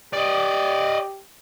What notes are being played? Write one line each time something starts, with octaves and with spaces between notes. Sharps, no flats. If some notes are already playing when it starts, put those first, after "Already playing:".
G4 D5 D#5